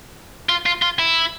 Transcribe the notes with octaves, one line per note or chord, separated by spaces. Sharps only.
F4
F4
F4
E4